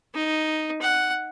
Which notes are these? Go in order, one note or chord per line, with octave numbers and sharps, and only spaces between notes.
D#4
F#5